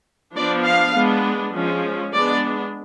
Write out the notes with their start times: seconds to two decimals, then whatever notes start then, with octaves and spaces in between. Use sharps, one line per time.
0.35 F3 B3 D4 D5
0.66 F5
0.95 G#3 B3 D4
1.54 F3 G#3 C#4
2.13 G#3 B3 D4 D5